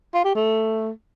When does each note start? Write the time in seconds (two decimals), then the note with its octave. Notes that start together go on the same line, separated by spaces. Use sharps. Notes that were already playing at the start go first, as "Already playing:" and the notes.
0.14 F4
0.25 G4
0.35 A3